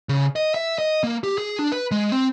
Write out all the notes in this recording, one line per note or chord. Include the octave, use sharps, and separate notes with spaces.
C#3
D#5
E5
D#5
A#3
G4
G#4
D4
B4
G#3
C4